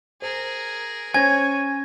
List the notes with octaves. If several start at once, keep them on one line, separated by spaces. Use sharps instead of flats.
G#4 A#4 C5
C#4 C5 C#5 G#5 G#6 A#6